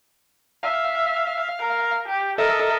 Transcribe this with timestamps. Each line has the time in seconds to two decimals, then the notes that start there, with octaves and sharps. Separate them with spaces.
0.63 E5 F5
1.59 A#4
2.08 G4
2.38 A4 A#4 D#5 E5